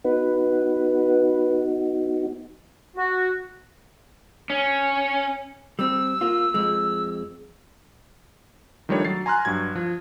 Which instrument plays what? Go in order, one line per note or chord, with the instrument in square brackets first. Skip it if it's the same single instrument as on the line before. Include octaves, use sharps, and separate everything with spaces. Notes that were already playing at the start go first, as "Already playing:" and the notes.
[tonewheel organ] B3 D#4 F#4 [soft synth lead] B4
[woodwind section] F#4
[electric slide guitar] C#4
[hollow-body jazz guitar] G3 C4 [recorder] E6
[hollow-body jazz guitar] A#3 F4
F2 G#3
[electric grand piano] D#3 F3 G3 A3 D4 C#5
F#3 A6 C7
G#5 A#5 C6 F6 F#6
G2 F#3 F#4 G#6
F3